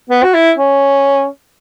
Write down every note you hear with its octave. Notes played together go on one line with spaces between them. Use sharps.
B3
F#4
E4
C#4